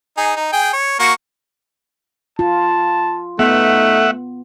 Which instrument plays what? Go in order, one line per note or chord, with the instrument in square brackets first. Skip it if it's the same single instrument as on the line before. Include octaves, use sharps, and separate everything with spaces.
[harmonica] D#4 G#4
D#4
G#4 G5
C#5
A#3 F#4 C#6
[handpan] F4 [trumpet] A5
[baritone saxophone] A3 [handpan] B3 [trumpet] D#4 [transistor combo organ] E5 F#5